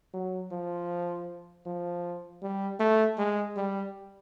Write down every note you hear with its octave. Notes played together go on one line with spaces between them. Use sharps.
F#3
F3
F3
G3
A3
G#3
G3